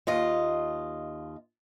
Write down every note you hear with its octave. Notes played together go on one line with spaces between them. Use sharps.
D#2 F4 D#5